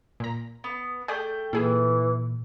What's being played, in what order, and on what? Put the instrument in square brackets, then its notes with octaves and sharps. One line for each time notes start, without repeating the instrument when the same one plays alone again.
[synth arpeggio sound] A#2 A#5
[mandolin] B3
[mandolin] A3 [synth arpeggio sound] G#4 D5 [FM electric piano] G5 G6
[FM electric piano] A#2 [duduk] E3 [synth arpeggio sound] E4 G#4 E5